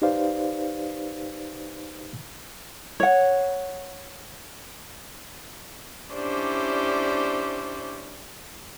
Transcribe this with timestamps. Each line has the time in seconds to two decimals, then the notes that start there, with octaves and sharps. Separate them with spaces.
0.02 D#4 G4 B4 C5 D5 F5
3.00 C#5 F#5
6.12 C#4 D4 E4 G4 C5 D5